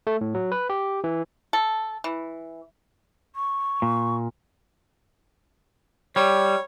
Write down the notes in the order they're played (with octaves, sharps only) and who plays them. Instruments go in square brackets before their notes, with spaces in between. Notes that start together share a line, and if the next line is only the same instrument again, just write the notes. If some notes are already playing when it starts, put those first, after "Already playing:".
[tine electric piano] A3
A2
F#3
B4
G4
E3
[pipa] A4
E3
[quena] C#6
[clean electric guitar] A#2
[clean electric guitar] G3 [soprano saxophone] C#5